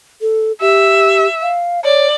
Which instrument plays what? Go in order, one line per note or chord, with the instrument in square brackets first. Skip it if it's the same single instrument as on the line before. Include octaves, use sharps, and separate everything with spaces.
[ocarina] A4
[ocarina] G4 [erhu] E5
[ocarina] F5
[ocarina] C#5 [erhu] D5